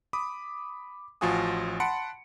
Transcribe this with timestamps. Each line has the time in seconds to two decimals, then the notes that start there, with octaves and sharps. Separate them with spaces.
0.13 B5 D6 D#6
1.21 A1 F3 F4 F#4 G#5 D#6
1.80 F#5 A5 B5 C6 C#7 D7